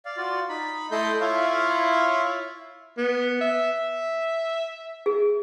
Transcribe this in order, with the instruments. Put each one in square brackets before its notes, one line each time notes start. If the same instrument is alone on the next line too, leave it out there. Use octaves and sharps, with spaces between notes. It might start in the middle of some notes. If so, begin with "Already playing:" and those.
[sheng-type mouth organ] D5 F5
F4 F#4 D5
D#4 B5
A3 E4 A4 D#5 C6 G6
E4 F4 C#5 E5 F5
[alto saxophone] B3
E5
[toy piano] G#4